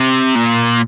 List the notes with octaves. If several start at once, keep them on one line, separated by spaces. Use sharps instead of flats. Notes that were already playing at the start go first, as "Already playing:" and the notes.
Already playing: C3
A#2